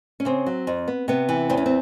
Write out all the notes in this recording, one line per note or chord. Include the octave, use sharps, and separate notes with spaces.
C#4
C#3 C4
F#3
F2
B3
C3 B3
E3
E2 C4
C#4
C4